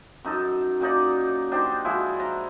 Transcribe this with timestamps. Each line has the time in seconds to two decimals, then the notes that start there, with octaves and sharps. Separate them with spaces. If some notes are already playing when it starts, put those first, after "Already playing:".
0.24 F#2 D#4 A4
0.80 F#2 A#2 D#4 D5
1.51 D4 D#4 G4 C5
1.84 F3 G#3 E4 F#4
2.18 E4 A#5 C6